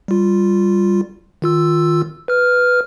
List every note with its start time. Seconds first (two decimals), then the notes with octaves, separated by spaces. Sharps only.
0.08 G3 F4
1.42 D#3 F4 E6
2.28 B4 F6